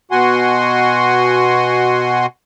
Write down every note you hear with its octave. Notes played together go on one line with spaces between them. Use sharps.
B2 F#4 F#5 G#5 C6